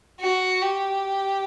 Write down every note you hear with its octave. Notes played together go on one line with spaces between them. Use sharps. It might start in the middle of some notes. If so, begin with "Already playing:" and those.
F#4
G4